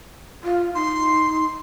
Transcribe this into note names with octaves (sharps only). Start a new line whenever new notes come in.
F4
D#4 C6